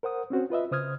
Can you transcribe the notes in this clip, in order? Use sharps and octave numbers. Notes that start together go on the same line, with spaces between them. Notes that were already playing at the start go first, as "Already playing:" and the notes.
A#4 C5 F#5 D#6
C4 C#4 F#4 C5
F4 B4 D#5 E5
C#3 C5 D#6 F6 G#6